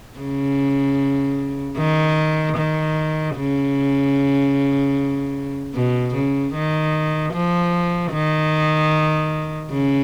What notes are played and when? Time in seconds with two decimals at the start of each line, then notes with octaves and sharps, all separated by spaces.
0.19 C#3
1.78 D#3
2.57 D#3
3.36 C#3
5.74 B2
6.14 C#3
6.54 D#3
7.33 F3
8.13 D#3
9.71 C#3